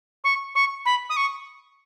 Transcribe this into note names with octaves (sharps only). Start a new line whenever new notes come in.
C#6
C#6
B5
D#6
C#6